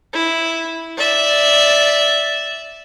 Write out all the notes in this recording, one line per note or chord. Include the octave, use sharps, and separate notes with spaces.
E4
D5 E5